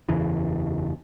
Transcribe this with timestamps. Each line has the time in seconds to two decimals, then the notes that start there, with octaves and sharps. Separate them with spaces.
0.09 F#1 E2 C#3 E3